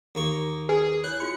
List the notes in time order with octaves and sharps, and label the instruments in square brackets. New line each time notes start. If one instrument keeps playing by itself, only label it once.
[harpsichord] D#2 A#3 C#6
[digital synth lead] G#4 [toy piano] B4 G#5
[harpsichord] E4 [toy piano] C#5 [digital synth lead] F#6
[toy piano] F4 F#4 B5 [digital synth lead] C#7